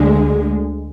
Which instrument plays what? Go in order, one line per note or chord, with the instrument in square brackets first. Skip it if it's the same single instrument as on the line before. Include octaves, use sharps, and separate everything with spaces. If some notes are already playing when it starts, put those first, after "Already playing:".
Already playing: [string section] D2 D3 G#3